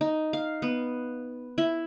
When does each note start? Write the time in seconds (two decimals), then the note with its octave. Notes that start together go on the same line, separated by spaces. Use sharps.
0.01 D#4
0.33 F5
0.62 B3
1.58 E4